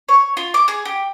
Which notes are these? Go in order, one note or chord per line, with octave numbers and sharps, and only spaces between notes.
C#5
F4
D6
G#4
G4